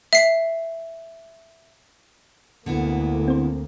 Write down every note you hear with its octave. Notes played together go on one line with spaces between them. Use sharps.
E5 C7
D2 D3 A#3 B3 E4
C4 C5